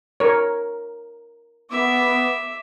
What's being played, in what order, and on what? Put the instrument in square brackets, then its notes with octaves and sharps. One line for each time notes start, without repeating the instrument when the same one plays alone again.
[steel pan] A#4 C#5
[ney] B3 [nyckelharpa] E5 D6